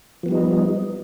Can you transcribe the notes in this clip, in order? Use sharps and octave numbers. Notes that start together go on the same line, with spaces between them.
F3 G3 B3 D#4